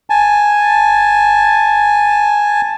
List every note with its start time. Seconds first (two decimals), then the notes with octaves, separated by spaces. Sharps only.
0.10 G#5 A5